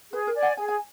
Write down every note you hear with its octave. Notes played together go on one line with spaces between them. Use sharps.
G#4 B4
A#4
D5 G#5
F#5
G#4 G#5
G#5